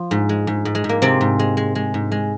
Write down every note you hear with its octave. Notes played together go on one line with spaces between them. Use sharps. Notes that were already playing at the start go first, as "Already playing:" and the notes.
Already playing: F3 F4
G#2
G#3
G#2
G#2
G#3
G#2
A#3
C3 G#3 C4
G#2
G#3
G#3
G#3
G#2
G#3